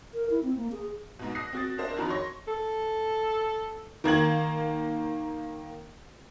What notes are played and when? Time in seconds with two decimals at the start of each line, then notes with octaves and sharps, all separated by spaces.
0.14 A#4
0.30 E4
0.43 C4
0.56 A#3
0.72 G#4
1.19 G#2 B2
1.35 D#6 F#6 A#6 C7
1.53 C4 F#4 A6
1.78 D4 A#4 C5 E5
1.96 F2 D#3 F#4 A#5 B5
2.10 C#5 C6 C#6 A#6
2.48 A4
4.04 D#3 A#3 G#6 F#7